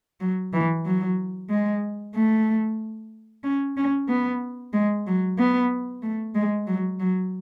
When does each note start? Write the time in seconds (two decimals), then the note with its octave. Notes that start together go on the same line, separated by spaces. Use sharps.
0.20 F#3
0.53 E3
0.85 F#3
1.50 G#3
2.15 A3
3.44 C#4
3.77 C#4
4.09 B3
4.73 G#3
5.06 F#3
5.38 B3
6.03 A3
6.35 G#3
6.67 F#3
7.00 F#3